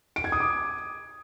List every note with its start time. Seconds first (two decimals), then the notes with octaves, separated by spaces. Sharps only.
0.16 D7
0.24 G#6
0.32 D#6
0.40 D6